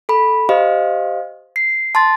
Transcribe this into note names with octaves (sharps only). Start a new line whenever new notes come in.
A4 B5
G4 C5 D#5 F5
C7
A5 C6 A6